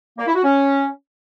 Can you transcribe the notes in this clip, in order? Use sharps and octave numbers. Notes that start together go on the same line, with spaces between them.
A#3
E4
F#4
C#4